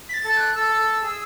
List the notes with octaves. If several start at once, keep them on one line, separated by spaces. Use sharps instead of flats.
B6
A6
A4
A6
F#6
A4 E6
G#4